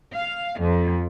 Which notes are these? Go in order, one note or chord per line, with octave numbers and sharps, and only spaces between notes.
F5
F2